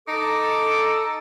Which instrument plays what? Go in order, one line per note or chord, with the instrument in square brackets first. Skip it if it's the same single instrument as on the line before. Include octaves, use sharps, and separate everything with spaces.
[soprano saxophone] D#4 [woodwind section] A4 [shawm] D6